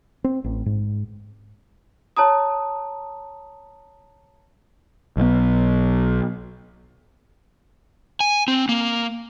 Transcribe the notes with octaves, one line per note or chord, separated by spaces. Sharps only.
C4
A1
G#2
C#5 A5 A#5 D#6
B1 B3
G#5
C4
A#3